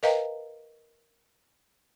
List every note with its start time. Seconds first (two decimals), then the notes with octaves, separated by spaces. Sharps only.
0.03 A#4 B4 D#5 F5 G5 A#5